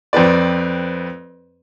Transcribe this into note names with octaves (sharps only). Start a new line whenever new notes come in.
F2 C4 B4 D5